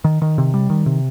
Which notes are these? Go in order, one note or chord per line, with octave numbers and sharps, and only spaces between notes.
D#3
D#3
C3
G3
D#3
C3